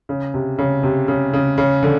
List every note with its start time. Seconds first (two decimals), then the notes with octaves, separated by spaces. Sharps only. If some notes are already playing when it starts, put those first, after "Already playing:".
0.09 C#3
0.34 C3
0.58 C#3
0.83 C3
1.08 C#3
1.33 C#3
1.58 C#3
1.83 D3